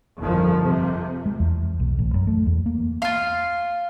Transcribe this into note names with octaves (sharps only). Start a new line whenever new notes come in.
G1 F2 D#3 F3
F2 C3
G#3
E2
B1
A1
F#2
A3
E2
A#3
F4 F5